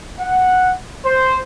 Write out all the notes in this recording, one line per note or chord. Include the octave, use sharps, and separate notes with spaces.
F#5
C5